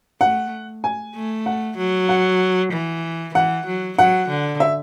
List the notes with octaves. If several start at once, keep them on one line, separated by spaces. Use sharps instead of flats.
A3 F#5
G#5
A3
F#5
F#3
F#5
E3
E3 F#5
F#3
F#3 F#5
D3
E5